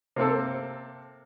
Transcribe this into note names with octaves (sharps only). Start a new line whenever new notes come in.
C3 A#3 C4 A4